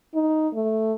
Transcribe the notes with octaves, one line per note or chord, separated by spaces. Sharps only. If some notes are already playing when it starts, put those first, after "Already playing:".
D#4
A3